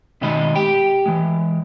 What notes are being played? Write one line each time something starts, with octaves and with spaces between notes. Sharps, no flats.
B2 D#3 G#3 D#5 B5
G4 G5
E3 G#3